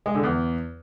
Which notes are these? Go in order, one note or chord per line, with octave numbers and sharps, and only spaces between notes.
G#3
D3
E2